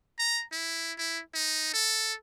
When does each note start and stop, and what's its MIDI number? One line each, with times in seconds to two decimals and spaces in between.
0.19 0.43 82
0.52 0.93 64
0.98 1.20 64
1.34 1.70 63
1.74 2.15 69